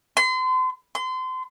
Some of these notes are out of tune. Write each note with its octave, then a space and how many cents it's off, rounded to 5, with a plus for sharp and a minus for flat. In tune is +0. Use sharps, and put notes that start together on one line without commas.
C6 -35
C6 -30